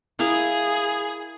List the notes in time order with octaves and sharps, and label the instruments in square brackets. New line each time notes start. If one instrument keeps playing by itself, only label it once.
[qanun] E4 A#4 F5 [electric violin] G#4